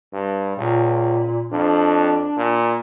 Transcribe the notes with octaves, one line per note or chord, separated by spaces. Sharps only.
G2
C#2 A#2
F2 D4
A#2